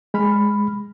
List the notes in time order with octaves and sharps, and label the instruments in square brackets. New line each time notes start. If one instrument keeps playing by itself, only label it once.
[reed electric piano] G#3 B5 F6